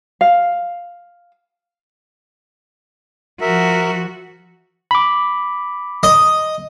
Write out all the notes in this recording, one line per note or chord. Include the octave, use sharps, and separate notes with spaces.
F5
F3 F#4 A#4 E5
B5 D6
D#5